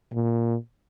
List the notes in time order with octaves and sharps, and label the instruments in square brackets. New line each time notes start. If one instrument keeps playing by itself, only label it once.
[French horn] A#2